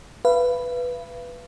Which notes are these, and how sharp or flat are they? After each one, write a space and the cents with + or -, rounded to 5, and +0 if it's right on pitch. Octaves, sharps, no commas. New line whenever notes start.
B4 +0 F5 -40